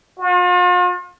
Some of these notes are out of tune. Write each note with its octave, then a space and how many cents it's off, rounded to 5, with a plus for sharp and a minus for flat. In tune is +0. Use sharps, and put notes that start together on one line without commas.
F4 +40